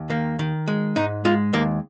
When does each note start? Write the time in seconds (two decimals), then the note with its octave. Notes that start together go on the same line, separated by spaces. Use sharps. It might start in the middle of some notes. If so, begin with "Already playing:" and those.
Already playing: D#2
0.10 D#3 A#3
0.39 D#3
0.68 G#3
0.96 G#2 D#4
1.25 G#3 F4
1.53 D#2 A#3